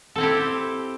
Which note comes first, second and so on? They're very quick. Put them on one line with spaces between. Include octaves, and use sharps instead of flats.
A4 C4 E4 G4